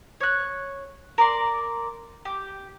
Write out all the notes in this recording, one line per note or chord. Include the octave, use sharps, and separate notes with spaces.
C#5 F#6
A#4 D5 C6
G4